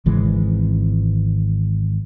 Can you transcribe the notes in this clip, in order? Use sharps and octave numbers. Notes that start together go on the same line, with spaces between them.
G#1 C#3 E3 G#3